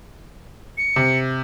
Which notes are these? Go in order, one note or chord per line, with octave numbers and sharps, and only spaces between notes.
C#7
C3